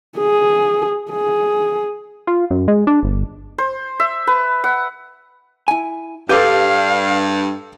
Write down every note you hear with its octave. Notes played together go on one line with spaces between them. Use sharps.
G#4
G#4
F4
F#2
G#3
D4
G1
C5
E5
B4
F#5
E4 G#5
G2 G4 A4 B4 F5 D6 G6